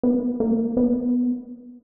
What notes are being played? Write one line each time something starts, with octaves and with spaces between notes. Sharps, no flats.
B3
A#3
B3